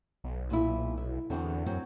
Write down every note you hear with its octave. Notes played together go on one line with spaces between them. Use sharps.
B1
A#2 E4
E4
E2 D3 C4 F#4
F#2 F#3 C4 F#4